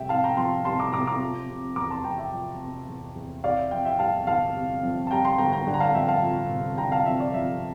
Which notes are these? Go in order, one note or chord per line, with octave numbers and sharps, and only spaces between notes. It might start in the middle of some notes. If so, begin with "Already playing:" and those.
Already playing: F1 G3 E5 G5
C3 F5 A5
G5 A#5
F2 A5 C6
G3 A5 C6
A#5 D6
F1 A#5 D6
A#5 D6
F3
C3
E2 A#5 D6
A5 C6
E2 G5 A#5
E5 G5
F3
C3
E2
E2
C3 D5 F5
E5
F2 E5 G5
E5 G5
G3 F5 A5
G1 F5 A5
C3
F2
A5
G3 G5 A#5
A5 C6
G1 G5 A#5
G5 A#5
D3
A#5
F5 A5
F2 E5 G5
F5 A5
F3
F1
D3 G5 A#5
F5 A5
F2 E5
D5
F3 E5